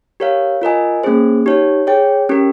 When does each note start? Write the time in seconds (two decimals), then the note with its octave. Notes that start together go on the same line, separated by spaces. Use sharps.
0.20 G4 A#4 C#5 F5
0.62 F4 A#4 D#5 G#5
1.04 A#3 C#4 G#4 C5
1.46 D#4 G4 C#5
1.87 G#4 C#5 G5
2.29 C#4 G4 A#4